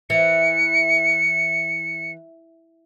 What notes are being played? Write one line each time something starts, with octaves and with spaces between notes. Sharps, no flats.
E3 C#7